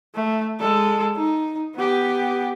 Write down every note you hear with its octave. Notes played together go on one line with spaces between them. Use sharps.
A3
G#3 A4
D#4
B3 G4